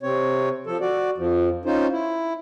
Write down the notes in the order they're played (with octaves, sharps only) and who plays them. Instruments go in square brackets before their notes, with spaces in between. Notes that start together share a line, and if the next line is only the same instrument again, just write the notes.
[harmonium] C3 C4 C#5
F3 A4
F#4 D5
F2 F3
C#4 D#4 F4 C5
E4